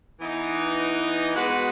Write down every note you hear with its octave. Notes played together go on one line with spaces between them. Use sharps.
E3 B3 D#4
G#3 B3 F#4 B4